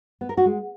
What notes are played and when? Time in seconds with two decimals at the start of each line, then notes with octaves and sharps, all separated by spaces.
0.21 B3
0.29 A#4
0.37 F#4
0.46 G#3